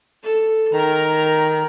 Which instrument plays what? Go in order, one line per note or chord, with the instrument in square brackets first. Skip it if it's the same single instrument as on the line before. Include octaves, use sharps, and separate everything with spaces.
[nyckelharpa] A4
[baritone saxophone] D#3 [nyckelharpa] A#4 A#5